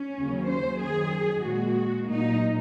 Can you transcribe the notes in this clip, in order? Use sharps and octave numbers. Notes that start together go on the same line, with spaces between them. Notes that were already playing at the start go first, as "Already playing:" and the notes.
Already playing: C#4
D#2 C#3 F#3
C5
F#2 D#3 F#3 G#4
A#2 G#3 F#4
A#2 F#3 D#4